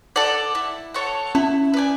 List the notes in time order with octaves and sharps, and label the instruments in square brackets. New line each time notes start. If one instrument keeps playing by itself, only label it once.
[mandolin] A4 D5 F#5
E4
A4 C#5 F#5
[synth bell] C#4 [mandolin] E4
[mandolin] B4 D5 G#5